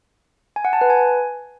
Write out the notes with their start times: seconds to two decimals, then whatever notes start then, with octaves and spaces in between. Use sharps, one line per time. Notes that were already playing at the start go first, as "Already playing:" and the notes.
0.56 G#5
0.65 F#5
0.73 A5
0.81 B4
0.90 G#5